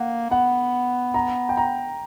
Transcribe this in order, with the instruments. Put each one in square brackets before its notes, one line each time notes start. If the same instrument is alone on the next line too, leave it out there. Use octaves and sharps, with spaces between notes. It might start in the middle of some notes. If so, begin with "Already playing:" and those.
Already playing: [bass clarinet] A#3 [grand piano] F#5
[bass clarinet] B3 [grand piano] F#5
[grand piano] A#5
G5
A#5